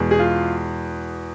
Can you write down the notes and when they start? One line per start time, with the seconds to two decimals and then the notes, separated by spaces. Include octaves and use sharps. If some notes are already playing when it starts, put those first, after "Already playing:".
Already playing: E2 B2 G#3
0.11 G#4
0.20 F4